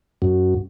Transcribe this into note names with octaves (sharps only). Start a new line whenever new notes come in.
F#2